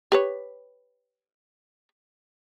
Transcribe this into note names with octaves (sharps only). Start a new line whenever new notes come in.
G4 B4 C#5